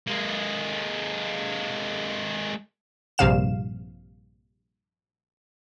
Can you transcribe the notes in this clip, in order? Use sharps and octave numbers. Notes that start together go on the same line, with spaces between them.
G#3 A#3
A#1 G2 C3 F5 E7